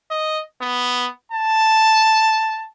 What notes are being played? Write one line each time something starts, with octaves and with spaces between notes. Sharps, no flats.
D#5
B3
A5